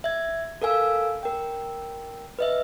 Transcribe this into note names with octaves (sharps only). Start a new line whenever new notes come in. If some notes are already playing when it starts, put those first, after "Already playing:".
E5 G#6
A4 A#4 F5 G#5 E6
A#4 G5
B4 D#5 E5